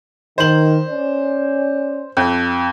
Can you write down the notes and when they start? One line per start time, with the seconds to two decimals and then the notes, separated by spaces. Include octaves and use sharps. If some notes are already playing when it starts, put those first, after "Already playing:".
0.38 D#3 C5 F#7
0.88 C#4 D5
2.17 F2